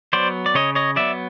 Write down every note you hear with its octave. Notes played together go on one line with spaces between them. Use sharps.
F#3 B3 C5 D5
D5
C#3 C#5 D#5
C#5 D#5
F#3 B3 D5 E5